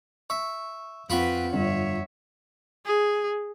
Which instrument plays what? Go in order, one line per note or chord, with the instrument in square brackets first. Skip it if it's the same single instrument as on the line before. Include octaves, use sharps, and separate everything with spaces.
[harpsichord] E5 [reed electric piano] C#6
[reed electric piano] F2 F#5 [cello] C4 B4 [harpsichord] F4 B5 C#6
[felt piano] G1 [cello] C#5 E5
[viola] G#4